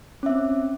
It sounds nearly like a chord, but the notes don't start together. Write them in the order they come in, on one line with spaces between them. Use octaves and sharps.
C#4 E5 C4